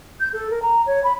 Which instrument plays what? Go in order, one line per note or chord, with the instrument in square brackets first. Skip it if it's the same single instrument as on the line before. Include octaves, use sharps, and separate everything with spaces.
[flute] G6
A4
A#4
A#5
C#5
B5